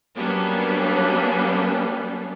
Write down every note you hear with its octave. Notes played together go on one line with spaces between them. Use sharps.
F#3 G3 A#3 B3 C#4 D4